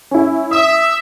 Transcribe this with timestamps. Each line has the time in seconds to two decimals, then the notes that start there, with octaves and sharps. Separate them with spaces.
0.11 C#4 E4
0.51 E5 D#6